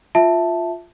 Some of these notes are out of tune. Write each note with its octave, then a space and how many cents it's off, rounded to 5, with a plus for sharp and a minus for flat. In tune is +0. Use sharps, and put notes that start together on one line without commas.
F4 +0 E5 +0 A5 +0